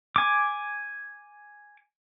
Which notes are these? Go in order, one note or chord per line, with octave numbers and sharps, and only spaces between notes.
G#5 D6